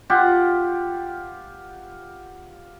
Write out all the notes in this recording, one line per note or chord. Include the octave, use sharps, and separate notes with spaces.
F4 G4 F#5